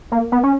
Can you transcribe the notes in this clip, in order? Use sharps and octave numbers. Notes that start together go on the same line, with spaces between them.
A#3
B3
C#4